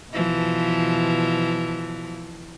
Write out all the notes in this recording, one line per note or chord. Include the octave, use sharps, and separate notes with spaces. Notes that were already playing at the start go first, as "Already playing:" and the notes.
B2 E3 F3